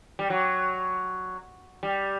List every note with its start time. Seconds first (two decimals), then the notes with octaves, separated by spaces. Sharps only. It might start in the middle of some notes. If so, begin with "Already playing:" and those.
0.19 G3
0.30 F#3
1.83 G3